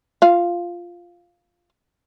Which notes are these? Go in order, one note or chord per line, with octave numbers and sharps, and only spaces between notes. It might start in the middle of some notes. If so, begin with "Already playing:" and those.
F4 F5